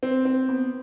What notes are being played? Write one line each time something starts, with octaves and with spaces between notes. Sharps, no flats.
C4
C4
B3